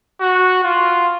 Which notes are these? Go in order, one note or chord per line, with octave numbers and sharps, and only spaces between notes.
F#4
F4